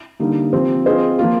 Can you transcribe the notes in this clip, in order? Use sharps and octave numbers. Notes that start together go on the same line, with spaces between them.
D3 G3 A#3 D#4
F3 C4 G4 C5
C4 F4 G#4 C5 D#5
F3 A#3 F4